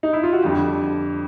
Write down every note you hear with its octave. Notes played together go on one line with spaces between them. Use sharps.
D#4
E4
F4
F#4
F2 D3 G3 G4